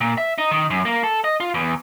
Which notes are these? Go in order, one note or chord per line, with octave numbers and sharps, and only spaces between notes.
A#2
E5
D#4
D#3
F#2
A#3
A4
D#5
F4
E2